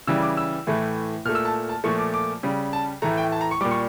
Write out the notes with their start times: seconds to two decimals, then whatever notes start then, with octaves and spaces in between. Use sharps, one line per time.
0.07 C#3 E3 G3 E6
0.22 D6
0.37 E6
0.67 A2 E3 A3
1.25 A#2 F6
1.29 A3
1.35 E6
1.45 A5
1.69 A5
1.84 A#2 F3 A3 C#6
1.99 D6
2.14 D6
2.43 C#3 G3
2.73 A5
3.02 A2 E3 A3 A#5
3.17 G5
3.32 A5
3.41 A#5
3.51 C#6
3.61 G3 D6
3.65 A#2
3.71 C#6